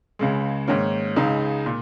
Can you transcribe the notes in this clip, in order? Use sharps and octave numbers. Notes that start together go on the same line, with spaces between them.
C#2 C#3 G#3
G#2 D#3 A#3 C#4
C#2 C#3 G#3 D#4
A#2